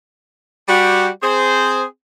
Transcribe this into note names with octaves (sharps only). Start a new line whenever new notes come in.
G3 F#4 G4
C4 G#4 C5